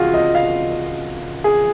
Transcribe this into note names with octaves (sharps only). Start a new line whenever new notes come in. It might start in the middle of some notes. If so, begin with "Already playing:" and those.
Already playing: C#2 F4 F#4 G#4
D#5
F5
G#4